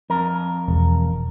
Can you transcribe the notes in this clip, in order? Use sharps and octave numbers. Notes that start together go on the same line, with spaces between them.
F2 A#4
E1